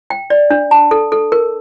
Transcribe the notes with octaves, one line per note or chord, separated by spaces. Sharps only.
G5
D5
D4
A5
A4
A4
A#4